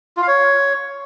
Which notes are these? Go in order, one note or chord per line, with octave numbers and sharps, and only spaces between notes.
F4
F5
C#5